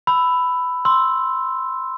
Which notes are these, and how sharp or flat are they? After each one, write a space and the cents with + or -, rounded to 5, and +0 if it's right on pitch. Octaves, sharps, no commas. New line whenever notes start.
B5 +15 E6 +0
C6 +0 E6 +0